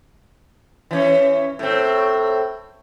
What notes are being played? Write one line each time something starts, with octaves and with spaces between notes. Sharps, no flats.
E3 C#4
A2 C4